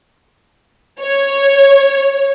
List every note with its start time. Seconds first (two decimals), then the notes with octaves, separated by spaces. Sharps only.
1.00 C#5